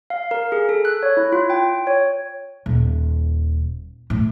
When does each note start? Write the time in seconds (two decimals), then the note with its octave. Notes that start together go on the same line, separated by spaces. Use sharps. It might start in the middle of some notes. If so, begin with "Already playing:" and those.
0.10 F5
0.31 A#4
0.52 G#4
0.69 A4
0.85 F#6
1.03 C#5
1.17 E4
1.32 F4
1.50 G5
1.87 C#5
2.66 D#1
4.10 A2